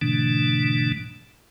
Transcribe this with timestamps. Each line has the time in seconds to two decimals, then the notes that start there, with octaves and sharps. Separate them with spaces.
0.01 G#2 B2 D3 E3 A3 D4